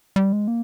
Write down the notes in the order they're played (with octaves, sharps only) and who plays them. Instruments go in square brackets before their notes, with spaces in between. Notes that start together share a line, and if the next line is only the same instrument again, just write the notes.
[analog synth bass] G3
G#3
A#3